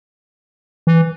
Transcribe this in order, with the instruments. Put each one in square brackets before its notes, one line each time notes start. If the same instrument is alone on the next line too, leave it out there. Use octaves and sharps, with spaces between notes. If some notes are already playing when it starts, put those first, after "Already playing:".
[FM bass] E3